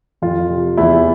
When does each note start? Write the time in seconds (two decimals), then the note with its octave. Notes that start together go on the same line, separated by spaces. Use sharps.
0.22 F2 F4
0.49 C3
0.77 E2 E4